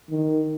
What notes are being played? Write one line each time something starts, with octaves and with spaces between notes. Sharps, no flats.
D#3